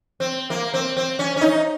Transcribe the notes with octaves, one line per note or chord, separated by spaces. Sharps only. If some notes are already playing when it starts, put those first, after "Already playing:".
C4
A#3
C4
C4
C#4
C#4
D#4